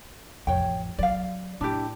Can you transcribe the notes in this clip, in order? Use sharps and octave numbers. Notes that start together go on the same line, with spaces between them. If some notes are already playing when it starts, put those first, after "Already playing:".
A1 F2 C#5 G5
F#3 D5 F5
A2 D4 E4 G4